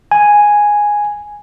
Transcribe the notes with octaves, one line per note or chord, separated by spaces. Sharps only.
G#5